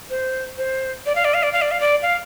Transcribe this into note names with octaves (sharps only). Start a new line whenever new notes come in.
C5
C5
D5
F5
D5
F5
D5
F5
D5
F5
D5
F5